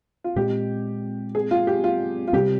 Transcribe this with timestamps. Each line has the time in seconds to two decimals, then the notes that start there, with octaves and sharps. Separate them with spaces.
0.24 F4
0.36 A#2 G#3 C4 G4
1.35 G#4
1.51 F4
1.67 G4
1.84 F4
2.28 F4
2.33 C3 G3 C4 G4